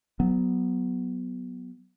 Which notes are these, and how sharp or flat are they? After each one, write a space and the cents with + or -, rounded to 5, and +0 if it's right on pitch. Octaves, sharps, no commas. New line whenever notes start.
F#3 +0 B3 +0